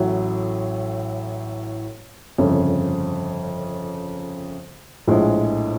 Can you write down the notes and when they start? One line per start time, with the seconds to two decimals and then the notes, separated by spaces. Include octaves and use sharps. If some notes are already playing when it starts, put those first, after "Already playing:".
Already playing: A1 A2 F#3
2.38 G1 F2 C#3
5.07 A#1 A2 F3 G#3